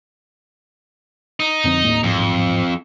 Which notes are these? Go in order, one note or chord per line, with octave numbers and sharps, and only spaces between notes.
D#4
F2 D3 C4
D#2 A2 A#3
D#1 A1 F2 G#2